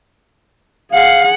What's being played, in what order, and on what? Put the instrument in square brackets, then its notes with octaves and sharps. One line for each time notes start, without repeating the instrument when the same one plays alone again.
[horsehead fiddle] G#4 F#5 [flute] F5